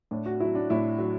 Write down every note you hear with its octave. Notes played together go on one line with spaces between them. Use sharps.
A2 D4
F#4
F#3 E4
D4
A2 E4
F#3